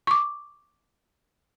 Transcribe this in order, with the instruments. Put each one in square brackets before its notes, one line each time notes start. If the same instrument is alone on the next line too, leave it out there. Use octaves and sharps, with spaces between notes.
[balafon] C#6 D6